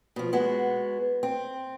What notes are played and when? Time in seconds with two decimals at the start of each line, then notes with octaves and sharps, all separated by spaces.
0.16 B2 F3
0.33 G#3 B3 F#4
1.23 C4